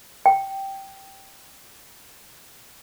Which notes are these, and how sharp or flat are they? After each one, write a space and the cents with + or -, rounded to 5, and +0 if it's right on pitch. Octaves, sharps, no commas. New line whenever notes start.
G5 -10